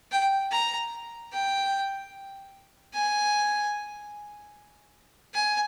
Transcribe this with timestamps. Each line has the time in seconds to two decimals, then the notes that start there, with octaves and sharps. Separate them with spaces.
0.12 G5
0.51 A#5
1.32 G5
2.94 G#5
5.34 G#5